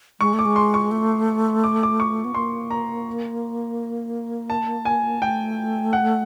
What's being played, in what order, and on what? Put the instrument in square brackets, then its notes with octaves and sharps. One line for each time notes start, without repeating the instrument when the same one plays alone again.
[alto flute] G#3 [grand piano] C#6
[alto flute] A3
[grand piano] D6
[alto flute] G#3
[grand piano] C6
C#6
[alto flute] A3
[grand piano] D6
D6
C#6
[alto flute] B3
[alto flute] A#3 [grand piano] C6
[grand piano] A#5
A5
G#5
[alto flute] A3 [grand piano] G5
[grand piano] F#5